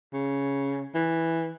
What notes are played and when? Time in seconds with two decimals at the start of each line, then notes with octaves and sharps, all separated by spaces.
0.14 C#3
0.95 E3